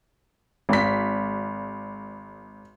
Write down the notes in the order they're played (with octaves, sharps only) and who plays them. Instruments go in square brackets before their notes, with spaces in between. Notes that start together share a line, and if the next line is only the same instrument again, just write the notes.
[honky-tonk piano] G#1 B6